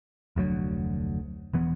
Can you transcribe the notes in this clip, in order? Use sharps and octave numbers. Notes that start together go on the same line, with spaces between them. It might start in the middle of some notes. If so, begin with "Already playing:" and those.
F1 D2 F#3
E1 E3 B3